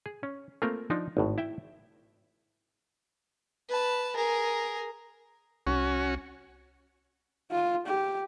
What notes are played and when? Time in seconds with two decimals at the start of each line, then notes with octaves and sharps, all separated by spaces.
0.06 G#4
0.23 C#4
0.62 A3 A#3 C4 F4 A#4
0.90 F3 D4 D#4
1.17 G#1 A2
1.38 E4 E5 G5
3.69 B4 A5
4.16 G#4 A#4
5.67 C2 C#4 F#4
7.51 F4
7.86 G4